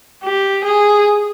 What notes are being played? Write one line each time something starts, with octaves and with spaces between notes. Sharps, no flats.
G4
G#4